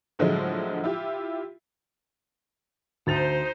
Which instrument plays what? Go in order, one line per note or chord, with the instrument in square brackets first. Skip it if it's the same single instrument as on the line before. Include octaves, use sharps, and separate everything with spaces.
[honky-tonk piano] A2 D3 F3 F#3 G#3 A3
E4 F4 G4
[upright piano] D2 A6 F7 [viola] D#4 C5